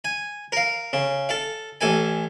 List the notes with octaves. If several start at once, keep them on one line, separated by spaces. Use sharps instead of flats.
G#5
A#4 F5
C#3
A4 F5
A1 A4 G#5